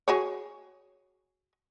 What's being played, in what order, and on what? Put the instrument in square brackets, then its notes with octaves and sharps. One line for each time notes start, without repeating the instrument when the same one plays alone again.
[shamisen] F#4 G#4 C#5